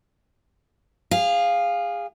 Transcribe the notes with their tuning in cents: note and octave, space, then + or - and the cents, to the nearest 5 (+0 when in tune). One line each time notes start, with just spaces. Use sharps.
G#4 -25 F5 +0